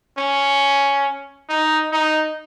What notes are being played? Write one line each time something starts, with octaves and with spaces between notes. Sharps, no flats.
C#4
D#4
D#4